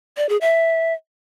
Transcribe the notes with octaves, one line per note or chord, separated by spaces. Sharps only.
D5
G#4
E5